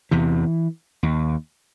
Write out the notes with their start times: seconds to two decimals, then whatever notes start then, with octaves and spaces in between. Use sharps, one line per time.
0.11 E2 C3 E3
1.03 D#2